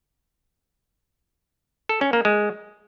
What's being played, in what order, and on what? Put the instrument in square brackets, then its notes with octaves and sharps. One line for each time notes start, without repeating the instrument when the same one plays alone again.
[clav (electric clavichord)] A4
C#4
A#3
G#3